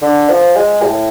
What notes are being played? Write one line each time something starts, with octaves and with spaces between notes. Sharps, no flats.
D3
F3
G#3
A2